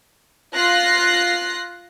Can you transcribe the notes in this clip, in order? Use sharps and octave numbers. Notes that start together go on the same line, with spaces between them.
F4 F#6 A#6 C7